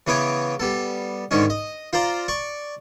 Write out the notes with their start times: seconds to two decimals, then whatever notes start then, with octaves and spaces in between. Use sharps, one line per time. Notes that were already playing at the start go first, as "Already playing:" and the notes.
0.07 C#3 E3 B3 B4 C#5 D6
0.60 G3 B3 A4
1.31 G#2 D3 D#3 G#3 C#4
1.50 D#5
1.93 F4 C5 D5 A#5
2.28 D5 C#6